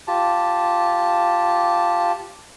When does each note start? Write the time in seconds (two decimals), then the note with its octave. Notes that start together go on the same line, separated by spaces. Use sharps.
0.08 F4 G4 A5